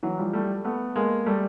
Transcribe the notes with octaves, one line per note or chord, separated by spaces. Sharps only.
E3 F#3
F3 G3
G3 A3
A3 B3
G#3 A#3
G3 A3